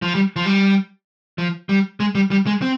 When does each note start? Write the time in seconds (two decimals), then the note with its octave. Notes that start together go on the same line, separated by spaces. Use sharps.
0.02 F3
0.15 G3
0.36 F3
0.46 G3
1.38 F3
1.69 G3
2.00 G#3
2.15 G3
2.31 G3
2.47 G#3
2.62 C4